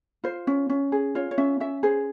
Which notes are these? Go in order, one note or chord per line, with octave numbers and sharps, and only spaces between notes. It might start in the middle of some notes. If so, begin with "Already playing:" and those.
F4 C5
C#4
C#4
G#4
F4 C#5
C#5
C#4 E5
C#4 E5
G#4 C5